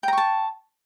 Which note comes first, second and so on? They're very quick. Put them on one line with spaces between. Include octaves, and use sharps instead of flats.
G5 A#5 C#6 A5